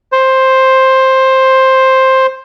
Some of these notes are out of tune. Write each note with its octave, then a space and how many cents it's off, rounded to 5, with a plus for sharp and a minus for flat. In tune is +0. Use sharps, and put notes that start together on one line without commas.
C5 +10